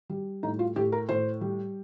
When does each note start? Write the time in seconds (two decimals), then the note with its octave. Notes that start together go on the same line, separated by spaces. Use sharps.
0.09 G3
0.43 A2 D#4
0.59 F4
0.76 A2 G4
0.92 A#4
1.09 A2 C5
1.41 G3